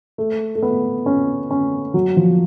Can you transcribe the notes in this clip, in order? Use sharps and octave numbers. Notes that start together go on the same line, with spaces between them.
A3
A3
B3
C#4
C#4
F#3
F3